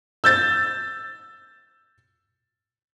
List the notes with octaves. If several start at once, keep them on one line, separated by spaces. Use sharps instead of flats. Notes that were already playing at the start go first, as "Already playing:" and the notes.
E6 G6 A6